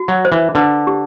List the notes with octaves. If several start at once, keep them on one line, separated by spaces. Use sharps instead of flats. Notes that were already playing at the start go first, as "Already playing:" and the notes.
Already playing: F#4
F#3
C5
E3
D3 B4
G4